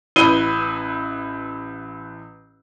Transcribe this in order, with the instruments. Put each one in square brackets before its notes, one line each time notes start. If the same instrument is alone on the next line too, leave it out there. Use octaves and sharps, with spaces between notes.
[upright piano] A1 E4 B4 D#7 G7